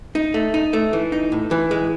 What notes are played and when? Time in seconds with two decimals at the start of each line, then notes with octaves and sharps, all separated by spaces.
0.15 D#4
0.34 A3
0.54 D#4
0.73 A3
0.93 E3
1.12 D#4
1.32 A2
1.51 E3
1.71 G#3